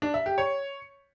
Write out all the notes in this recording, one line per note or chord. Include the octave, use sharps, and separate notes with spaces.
D4
E5
G4
C#5